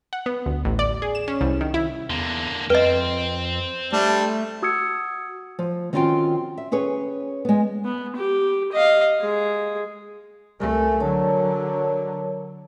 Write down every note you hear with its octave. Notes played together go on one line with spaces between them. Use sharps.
F#5
B3
D2
A1
D5
G#4
E7
C#4
C2
D#3
E4
E2 D3 A#3
F2 B4 C5 D#5 G5
G3 A3 D4
F#4 D#6 E6 G#6 C#7
F3
D#3 C4 C#4 F4 F#4 G5
E5
C#4 G#4 B4 C#5
G#3 B3
B3
G4
D#5 F5
G#3 G#4
C2 A3 A#4 G#5
D3 F#3 A#4 C#5 A5